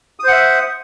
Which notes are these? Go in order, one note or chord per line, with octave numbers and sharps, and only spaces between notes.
C5 E5 F#5 D#6